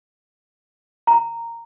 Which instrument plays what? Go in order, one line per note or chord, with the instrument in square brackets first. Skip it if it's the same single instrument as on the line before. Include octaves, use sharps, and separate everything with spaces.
[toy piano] A#5